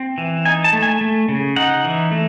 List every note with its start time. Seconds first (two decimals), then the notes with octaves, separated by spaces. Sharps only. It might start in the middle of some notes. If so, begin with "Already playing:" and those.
Already playing: C4
0.18 E3
0.45 D#4 G#5
0.64 A5
0.73 A3
0.82 G#5
1.01 A3
1.29 C#3
1.56 D#4 F#5
1.84 E3
2.11 A3